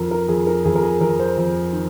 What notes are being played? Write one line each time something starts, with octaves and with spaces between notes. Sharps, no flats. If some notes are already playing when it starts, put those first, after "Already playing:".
Already playing: F2 A#4
A#4
F2 G#4
A#4
F2 G#4
A#4
G#4
F2 A#4
C5
F2
D#3